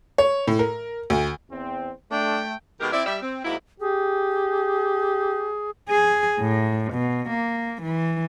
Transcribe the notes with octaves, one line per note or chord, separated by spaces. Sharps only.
C#5
A2
A#4
D2
E2 C4
A3 D4 G5
B2 D#3 G#3 A#3 G4 A#4
C4 E4 D5
G3 E5
C4
G#2 F#3 A#3 E4
G4 G#4
G#4
A2
B2
A#3
E3